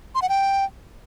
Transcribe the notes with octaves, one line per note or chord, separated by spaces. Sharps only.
C6
F#5
G5